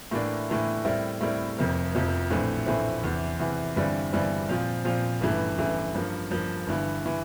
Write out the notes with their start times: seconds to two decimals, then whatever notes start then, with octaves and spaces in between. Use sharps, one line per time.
0.11 A2 E3 A#3 D4
0.49 A2 E3 A#3 D4
0.85 A2 G3 C4 E4 A#4
1.21 A2 G3 C4 E4 A#4
1.58 F1 F2 C3 F3 A#3
1.94 F1 F2 C3 F3 A#3
2.31 A#1 A2 E3 A3 C4
2.66 A#1 A2 E3 A3 C4
3.03 E2 C3 E3
3.39 E2 C3 E3
3.76 G1 G2 E3 G3 C4
4.13 G1 G2 E3 G3 C4
4.49 A#2 F3 C4 F4
4.85 A#2 F3 C4 F4
5.21 A1 G2 E3 A3
5.58 A1 G2 E3 A3
5.94 G2 F3 A#3
6.31 G2 F3 A#3
6.67 G1 G2 E3
7.06 E3